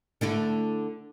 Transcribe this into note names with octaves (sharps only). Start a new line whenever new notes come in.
D3 A3 E4